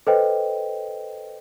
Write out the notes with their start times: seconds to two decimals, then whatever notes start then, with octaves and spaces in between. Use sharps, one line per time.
0.07 A4 B4 C5 D#5 G5